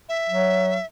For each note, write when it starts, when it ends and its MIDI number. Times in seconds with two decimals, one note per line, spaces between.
0.09 0.86 76
0.30 0.78 54